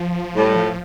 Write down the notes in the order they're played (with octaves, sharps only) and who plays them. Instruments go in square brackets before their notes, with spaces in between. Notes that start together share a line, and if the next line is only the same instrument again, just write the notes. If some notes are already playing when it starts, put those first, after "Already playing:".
Already playing: [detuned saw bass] F3
[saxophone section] A2 [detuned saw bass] G3
[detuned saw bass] F3